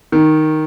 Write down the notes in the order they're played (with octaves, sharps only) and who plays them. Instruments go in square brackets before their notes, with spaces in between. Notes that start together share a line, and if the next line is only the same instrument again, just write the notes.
[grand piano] D#3